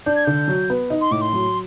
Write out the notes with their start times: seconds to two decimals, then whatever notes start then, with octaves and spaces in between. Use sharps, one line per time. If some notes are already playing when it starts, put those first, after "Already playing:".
0.06 D4 G6
0.16 G#6
0.25 D3 G6
0.48 F#3
0.70 B3
0.90 D#4
1.01 C6
1.11 A2 D6
1.21 C6
1.33 F#3